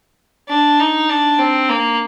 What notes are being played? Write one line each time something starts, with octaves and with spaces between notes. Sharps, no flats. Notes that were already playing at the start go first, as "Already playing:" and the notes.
D4
D#4
D4
C4
A#3